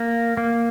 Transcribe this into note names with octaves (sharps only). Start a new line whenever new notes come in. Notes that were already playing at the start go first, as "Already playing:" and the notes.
Already playing: A#3
A#3